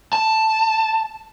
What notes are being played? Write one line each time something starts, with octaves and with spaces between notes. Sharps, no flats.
A5